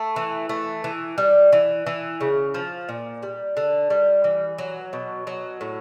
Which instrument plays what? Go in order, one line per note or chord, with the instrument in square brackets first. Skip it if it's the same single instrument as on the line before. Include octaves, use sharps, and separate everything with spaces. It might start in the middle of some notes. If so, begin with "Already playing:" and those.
Already playing: [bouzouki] A3
E3
A3
E3
G3
E3
E3
C#3
F3
A#2
G3
D3
G3
E3
F#3
B2
F#3
A2